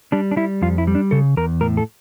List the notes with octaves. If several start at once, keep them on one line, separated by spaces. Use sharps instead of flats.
G3 D4
D4
G3 E4
F2 F4
E4
G3
D4
C#3 A4
E2 A#4
A2 A#4
A4